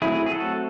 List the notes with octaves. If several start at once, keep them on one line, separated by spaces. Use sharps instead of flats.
F#3 A3 C4 E4 G#4
G#4
F#4 A4